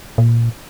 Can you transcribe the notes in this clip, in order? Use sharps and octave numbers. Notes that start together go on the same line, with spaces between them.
A#2